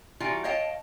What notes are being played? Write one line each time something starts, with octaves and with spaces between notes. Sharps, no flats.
E3 G3 A#3 F4 F#4
C#5 D#5 F5 G5 A5